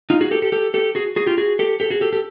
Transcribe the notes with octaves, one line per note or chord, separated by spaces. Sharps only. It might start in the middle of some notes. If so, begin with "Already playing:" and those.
D#4 F4
F#4 G#4
G4 A4
G4 A4
G4 A4
G4 A4
F#4 G#4
F#4 G#4
F4 G4
F#4 G#4
G4 A4
G4 A4
F#4 G#4
G4 A4
G4 A4